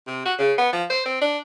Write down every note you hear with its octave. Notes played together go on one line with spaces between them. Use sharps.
C3
F#4
C#3
B3
F3
C5
C4
D4